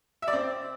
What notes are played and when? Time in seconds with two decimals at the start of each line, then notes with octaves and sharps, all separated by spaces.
0.22 E5
0.28 D5
0.33 C4